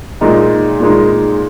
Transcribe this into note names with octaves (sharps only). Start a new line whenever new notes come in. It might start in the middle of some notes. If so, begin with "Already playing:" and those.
A#2 G#3 D#4
A#2 G#3 D#4